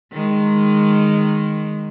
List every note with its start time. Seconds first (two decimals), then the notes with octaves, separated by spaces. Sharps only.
0.13 D#3 G#3